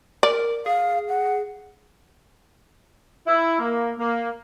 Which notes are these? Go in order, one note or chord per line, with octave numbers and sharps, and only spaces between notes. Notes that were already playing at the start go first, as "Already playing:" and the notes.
A#4 D5
G#4 F5
F#5
E4
A#3
A#3